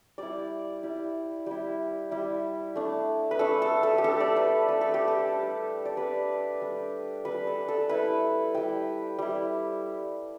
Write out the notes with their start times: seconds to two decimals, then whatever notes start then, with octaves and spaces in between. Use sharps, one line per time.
0.18 G3 E4 D5
0.83 G3 E4
1.46 G3 E4
2.11 G3 E4
2.75 A3 D4
3.31 B4
3.39 A3 D4 A4
3.62 A4
3.83 A4
3.98 G4
4.04 A3 D4 A4
4.20 D5
4.36 B4
4.68 A3 D4 B4
4.81 A4
4.94 G4
5.08 A4
5.32 G3 D4
5.85 D5
5.97 G3 D4 B4
6.62 G3 D4
7.25 G3 D4 B4
7.47 A4
7.68 A4
7.89 G3 E4 B4
8.54 G3 E4 G5
9.19 G3 E4